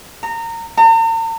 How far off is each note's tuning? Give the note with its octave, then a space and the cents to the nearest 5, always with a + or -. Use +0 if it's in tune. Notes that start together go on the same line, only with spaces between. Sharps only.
A#5 -25
A#5 -45